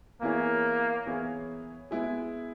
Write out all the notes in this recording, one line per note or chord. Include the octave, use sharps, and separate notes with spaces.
E3 A#3 B3 E4 G#4 C#5
E3 B3 E4 G#4 C#5
G#3 B3 E4 G#4